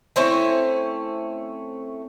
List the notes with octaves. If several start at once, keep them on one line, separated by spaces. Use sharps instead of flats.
A3 C4 C#4 E4